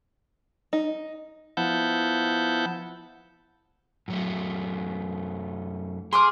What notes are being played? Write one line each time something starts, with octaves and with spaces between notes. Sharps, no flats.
D#4
F3 B3 E4 F#5 A5 G6
F#2 F#3 A3
G#4 C6 D6 F6